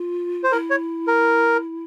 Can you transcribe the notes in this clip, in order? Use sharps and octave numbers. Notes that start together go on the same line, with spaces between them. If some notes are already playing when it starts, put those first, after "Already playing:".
Already playing: F4
C5
E4 A#4
C#5
A#4